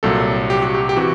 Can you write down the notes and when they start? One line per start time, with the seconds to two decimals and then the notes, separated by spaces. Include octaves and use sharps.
0.03 C2 A#2 F#3 A4
0.50 G4
0.62 F#4
0.75 G4
0.89 G4
0.96 C3 E3 F#4